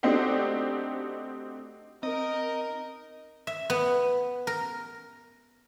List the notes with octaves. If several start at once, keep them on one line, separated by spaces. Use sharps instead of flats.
A3 C4 D4 D#4 F#4 G4
C4 D#4 A#4 D#5
E5
B3
A#4